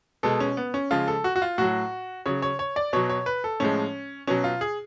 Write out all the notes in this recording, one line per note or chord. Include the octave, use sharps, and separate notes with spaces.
B2 G#3 A4
C#4
B3
C#4
C#3 F3 G#3 F4
A4
F#4
F#4
F4
A2 F#3 F#4
C#3 F#3 C#5
C#5
C#5
D5
B2 F#3 C#5
C#5
B4
A4
A2 F3 G#3 C#4
B2 F#3 C#4
F4
G#4